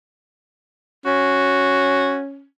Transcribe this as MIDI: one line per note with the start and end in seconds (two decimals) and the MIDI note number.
1.06 2.45 61
1.06 2.17 66